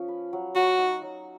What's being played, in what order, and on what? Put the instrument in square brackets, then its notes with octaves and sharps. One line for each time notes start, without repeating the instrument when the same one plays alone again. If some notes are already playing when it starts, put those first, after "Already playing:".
Already playing: [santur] F3 C#4
B4
F#3
[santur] F#3 [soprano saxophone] F#4
[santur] D#4
F#3